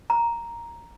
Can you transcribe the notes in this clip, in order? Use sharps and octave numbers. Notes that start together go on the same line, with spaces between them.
A#5